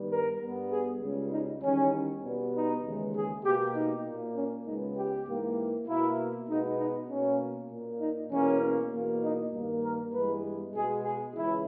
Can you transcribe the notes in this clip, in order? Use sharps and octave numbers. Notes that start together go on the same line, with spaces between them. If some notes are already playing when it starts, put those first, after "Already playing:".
Already playing: G2 D#3 G3 B3
A#4
G2 G3 B3
G#4
C#2 C#3 G3
D#4
E2 D#3 G3 C#4
B2 G3 B3
D#4
D#2 C#3 E3 G#3
G#4
B2 A#3 G4
D#4
A#2 A#3
C#4
C#2 C#3 G#3 B3 D#4
G4
G#2 E3 A#3
B2 A#3 E4
B2 G#3 B3 D#4
D#4
B2 A#3 C#4
A#2 A#3
D#4
E2 B2 A#3 C#4
E2 B2 A#3
D#4
G2 D#3 A#3
A#4
G2 E3 G#3 B3 B4
B2 G#3 B3 G#4
G#4
C#2 C#3 E3 E4